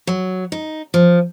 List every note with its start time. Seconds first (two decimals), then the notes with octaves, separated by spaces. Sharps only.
0.07 F#3
0.52 D#4
0.94 F3